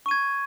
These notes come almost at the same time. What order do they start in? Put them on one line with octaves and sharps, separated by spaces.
C#6 D#7 G#6